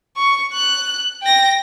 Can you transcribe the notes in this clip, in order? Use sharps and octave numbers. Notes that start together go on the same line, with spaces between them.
C#6
F#6
G5 A#6